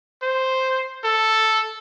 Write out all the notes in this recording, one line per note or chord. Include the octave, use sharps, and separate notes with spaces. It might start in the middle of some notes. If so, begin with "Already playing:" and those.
C5
A4